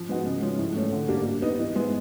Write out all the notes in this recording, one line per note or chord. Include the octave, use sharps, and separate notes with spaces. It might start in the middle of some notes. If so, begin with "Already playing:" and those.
Already playing: F3
G#3 B3 D#4 F#4
C#3
F3 G#3 C#4
A2
E3 A3 C#4
D3
G3 A#3 D4
G3
B3 D#4
E3
G#3 B3 E4